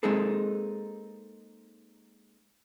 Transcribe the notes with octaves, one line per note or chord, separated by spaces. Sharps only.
G#3 A#3 C4 D#4 G#4 A4